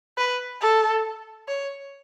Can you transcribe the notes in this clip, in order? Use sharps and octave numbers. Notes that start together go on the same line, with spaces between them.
B4
A4
C#5